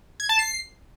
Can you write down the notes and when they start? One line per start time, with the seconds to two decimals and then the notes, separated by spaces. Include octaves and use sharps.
0.20 G#6
0.29 A5
0.39 C7